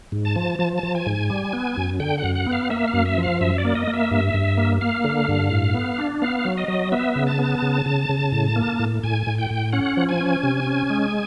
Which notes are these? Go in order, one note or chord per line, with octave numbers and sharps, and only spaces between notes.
G#2
A5
F3
F3 A5
A5
F3
G#5
G#2
G3
B3
F#2
D3 G5
F#5
F#2
F#5
B3
F5
A#3 E5
F5
F#2
E5
F3
F5
F#2 E5
D5
A#3
D#5
A#3
E5
G2
G2
A#3
A#3 F5
D3
G2
A2
B3
D4
B3 F5
F#3
D#5
F#3
B3 E5
C#3
A5
B3
C#3
C#3
C#3
A2
A#3
A2
A2 G#5
A2
G5
A2
C#4 F#5
F3
G#5
C#4
C3
C#4
G#3